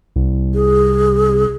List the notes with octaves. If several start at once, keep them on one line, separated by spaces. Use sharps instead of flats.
C2
G#4